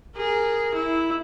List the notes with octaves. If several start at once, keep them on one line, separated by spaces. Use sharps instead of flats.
G#4 A#4
E4